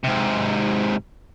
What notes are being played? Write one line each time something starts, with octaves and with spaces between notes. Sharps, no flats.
G#2 C3